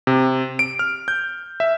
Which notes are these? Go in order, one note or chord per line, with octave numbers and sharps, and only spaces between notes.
C3
D7
F6
G6
E5